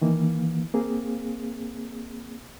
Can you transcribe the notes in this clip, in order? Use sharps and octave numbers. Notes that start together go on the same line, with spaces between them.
D#3 E3 A#3
A#3 C4 G#4